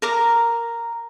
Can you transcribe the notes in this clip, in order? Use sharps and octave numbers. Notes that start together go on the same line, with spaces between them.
A#4 A#5 D6